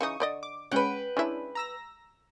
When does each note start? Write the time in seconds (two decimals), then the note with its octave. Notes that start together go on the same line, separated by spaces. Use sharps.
0.01 C#3 E3 D#4 C#6 D#6
0.20 D3 D5 D#5
0.43 D6
0.72 G#3 C#4 B4 F#5 G5
1.17 G#3 C#4 D4 E4 E5
1.55 A#5 E6 A#6